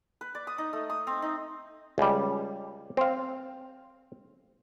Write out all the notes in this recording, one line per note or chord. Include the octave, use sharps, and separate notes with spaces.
B4
D5
D#6
D#4
A3
D#6
C4
D#4
C#2 G3
C4 F5